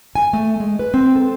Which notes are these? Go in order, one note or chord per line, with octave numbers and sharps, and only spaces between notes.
G#5
A3
G#3
B4
C4
A4